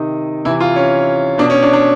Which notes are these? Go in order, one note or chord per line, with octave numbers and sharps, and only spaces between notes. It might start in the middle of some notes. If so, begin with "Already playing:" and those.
Already playing: C3 D#3 D#4
C3 E3 E4
F4
C#4
B2 D4
C#4
D4
D4